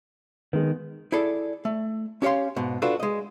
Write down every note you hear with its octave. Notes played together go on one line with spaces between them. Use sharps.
D#3 G#3 B3
E4 G#4 A4 D5
A3
C#4 G4 C#5 F5 C6
G#2 B2
D4 F4 F#4 A4 B4
G#3 D#5